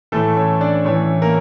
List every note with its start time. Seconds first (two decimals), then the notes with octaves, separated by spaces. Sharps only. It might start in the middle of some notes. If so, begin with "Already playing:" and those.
0.12 A2 E3 A3 A4
0.36 C#4 C#5
0.61 D4 D5
0.85 A2 E3 C#4 C#5
1.22 A#3 A#4